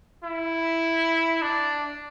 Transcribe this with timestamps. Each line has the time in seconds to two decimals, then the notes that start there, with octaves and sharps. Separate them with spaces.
0.24 E4
1.42 D4